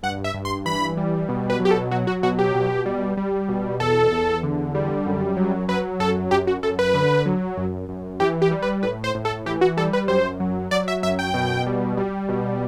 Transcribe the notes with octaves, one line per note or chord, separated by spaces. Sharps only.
G2 F#5
E5
G2
C6
E3 B5
G3
B2
B4
F#3
G4
A4
F#3 F#4
F#4
B2 F#4
G4
B2
G3
G3
B2
E2 A4
E2
D3
G3
F#2
F#3
F#3 B4
F#2 A4
F#2 G4
F#4
F#2 A4
B4
D3
F#3
F#2
F#2
E3 G4
G4
G3
B4
A2 B4
C5
A2
A4
E3 G4
F#4
G3 A4
B4
F#2 C5
F#3
F#3 D5
E5
F#2 E5
G5
B2
G3
G3
B2